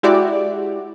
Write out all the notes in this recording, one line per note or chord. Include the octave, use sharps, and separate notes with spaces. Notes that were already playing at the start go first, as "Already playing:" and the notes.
G#3 E4 F#4 G4 D5